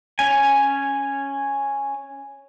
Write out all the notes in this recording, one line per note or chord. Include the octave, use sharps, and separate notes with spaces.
C#4 G#5